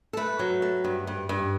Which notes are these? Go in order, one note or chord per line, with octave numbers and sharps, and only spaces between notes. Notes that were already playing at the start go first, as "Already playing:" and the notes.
A4
A3 B4
F#3
A3
G2
G2
G2